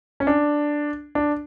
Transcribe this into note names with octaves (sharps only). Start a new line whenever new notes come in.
C#4
D4
D4